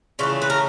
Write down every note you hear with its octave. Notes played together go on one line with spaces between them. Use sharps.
C#3 E3 A3 F4
B4
A#4